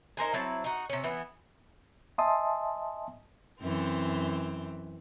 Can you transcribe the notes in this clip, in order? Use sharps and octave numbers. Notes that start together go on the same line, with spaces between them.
D#4 A#4 C5 G#5
F#3 C4 E4 A5
D#4 F#4
C3 C#4
E3 B3
D#5 E5 G#5 A5 C6 D#6
F#2 E3 C4